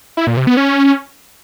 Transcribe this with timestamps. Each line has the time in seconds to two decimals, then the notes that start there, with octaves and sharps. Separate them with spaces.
0.17 E4
0.27 A#2
0.37 C3
0.47 B3
0.57 C#4